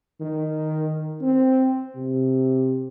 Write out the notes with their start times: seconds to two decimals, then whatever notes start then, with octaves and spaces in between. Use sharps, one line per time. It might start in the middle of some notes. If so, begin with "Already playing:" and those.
0.20 D#3
1.21 C4
1.96 C3